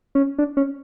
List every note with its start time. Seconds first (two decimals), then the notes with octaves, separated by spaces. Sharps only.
0.15 C#4
0.38 D4
0.57 C#4